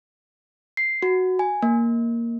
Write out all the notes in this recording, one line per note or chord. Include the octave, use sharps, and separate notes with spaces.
C7
F#4
G#5
A#3